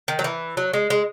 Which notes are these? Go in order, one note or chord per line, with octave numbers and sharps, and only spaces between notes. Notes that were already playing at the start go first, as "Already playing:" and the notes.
D#3
F#3
E3
F#3
G#3
G#3